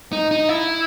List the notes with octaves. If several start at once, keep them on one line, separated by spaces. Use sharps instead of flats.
D#4
D#4
E4